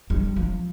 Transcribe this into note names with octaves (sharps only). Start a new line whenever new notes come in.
G3
F3